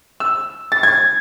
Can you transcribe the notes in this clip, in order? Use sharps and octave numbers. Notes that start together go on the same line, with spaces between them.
E6
A6
G#6